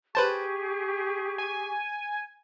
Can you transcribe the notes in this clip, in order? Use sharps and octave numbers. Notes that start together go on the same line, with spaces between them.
G4 G#4 B4 C5 A5 C#6
G#5